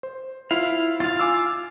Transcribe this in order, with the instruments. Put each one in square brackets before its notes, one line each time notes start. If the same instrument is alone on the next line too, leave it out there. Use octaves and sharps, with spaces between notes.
[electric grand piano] C5
[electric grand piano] E4 F4 [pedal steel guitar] F5
[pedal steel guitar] F4 F5 [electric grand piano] A6
[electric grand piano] G#5 D6 E6